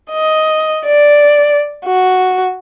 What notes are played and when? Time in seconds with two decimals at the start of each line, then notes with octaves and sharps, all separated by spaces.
0.11 D#5
0.86 D5
1.85 F#4